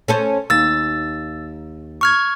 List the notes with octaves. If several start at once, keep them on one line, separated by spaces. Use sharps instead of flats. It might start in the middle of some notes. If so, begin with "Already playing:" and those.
C#4 A4 C5
D#2 E6 A6
C#6 F6 G#6